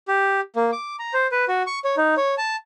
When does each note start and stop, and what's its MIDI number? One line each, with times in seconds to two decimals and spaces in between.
0.08 0.41 67
0.56 0.71 58
0.72 0.96 86
0.99 1.14 82
1.14 1.27 72
1.32 1.45 71
1.49 1.63 66
1.67 1.79 85
1.85 1.95 73
1.97 2.15 63
2.17 2.35 73
2.38 2.56 81